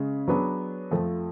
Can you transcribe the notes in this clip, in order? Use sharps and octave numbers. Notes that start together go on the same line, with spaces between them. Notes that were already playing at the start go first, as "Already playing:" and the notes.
Already playing: C#3 G#3 C#4 G#4
F#3 B3 D4 G#4 B4
F2 F3 A3